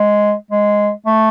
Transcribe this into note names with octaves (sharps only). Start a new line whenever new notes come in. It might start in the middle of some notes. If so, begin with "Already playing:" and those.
Already playing: G#3
G#3
A3